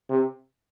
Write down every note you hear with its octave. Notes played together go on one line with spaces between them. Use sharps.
C3